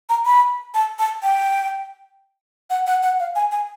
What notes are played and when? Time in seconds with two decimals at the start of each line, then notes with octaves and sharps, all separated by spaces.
0.09 A#5
0.26 B5
0.74 A5
0.99 A5
1.23 G5
2.70 F#5
2.86 F#5
3.02 F#5
3.19 F5
3.35 G#5
3.51 G#5